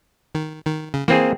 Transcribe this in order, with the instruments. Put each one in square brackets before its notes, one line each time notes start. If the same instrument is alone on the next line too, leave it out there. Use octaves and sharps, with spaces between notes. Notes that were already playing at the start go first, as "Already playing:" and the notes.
[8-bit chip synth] D#3
D#3
C#3
[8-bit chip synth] E3 [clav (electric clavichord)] A#3 C4 G#4